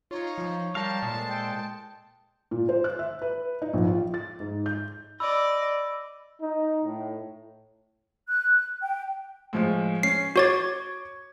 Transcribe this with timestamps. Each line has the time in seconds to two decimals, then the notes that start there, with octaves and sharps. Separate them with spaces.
0.11 D#4 F4 C#5
0.38 F3
0.75 G3 G4 A#4 F5 A5
1.03 A#2 G#3 A4 C5
1.29 G5
2.51 A#2
2.69 C5
2.84 F#6
2.99 E5
3.22 B4
3.62 D#4
3.74 A#1
3.87 F4
4.14 A6
4.40 G#2
4.66 G6
5.20 D5 D#5 B5 E6
6.41 D#4
6.84 A2
8.28 F#6
8.82 G5
9.53 A2 F3 G#3
10.03 C#4 C7
10.36 F#4 C#5 C#6 D6 G#6 A6